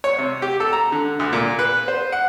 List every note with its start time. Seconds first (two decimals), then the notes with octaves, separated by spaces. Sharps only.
0.04 C#5
0.18 C3
0.42 G4
0.60 A4
0.73 A#5
0.92 D3
1.19 D2
1.33 A#2
1.59 B4
1.88 C5
2.12 F#5